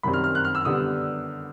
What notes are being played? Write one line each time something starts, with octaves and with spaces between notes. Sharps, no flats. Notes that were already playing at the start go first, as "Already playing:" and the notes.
F#2 D#3 G3 C4 B5
F6
F6
F#6
F6
E6
D3 G3 B3 D#6